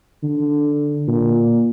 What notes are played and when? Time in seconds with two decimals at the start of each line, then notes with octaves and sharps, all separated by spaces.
0.23 D3
1.07 A#2